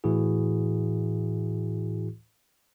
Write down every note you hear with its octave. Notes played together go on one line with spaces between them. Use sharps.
A2 E3 E4 F#4 G#4